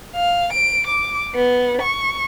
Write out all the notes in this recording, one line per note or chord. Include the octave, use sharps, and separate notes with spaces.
F5
D7
D6
B3
C#6